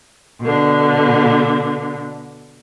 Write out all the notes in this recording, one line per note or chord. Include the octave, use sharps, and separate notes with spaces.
B2 D3